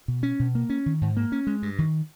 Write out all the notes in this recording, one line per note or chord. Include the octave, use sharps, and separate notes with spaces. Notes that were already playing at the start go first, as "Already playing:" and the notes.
B2
C#4
B2
A#3
C#4
D#3
G#2
A#3
C#4
G#3
G2
D#3